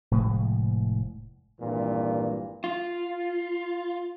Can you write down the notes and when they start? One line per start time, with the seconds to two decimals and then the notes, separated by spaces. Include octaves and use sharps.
0.11 F1 A2 G#3
1.60 G#1 G2 A#2 E3
2.64 F4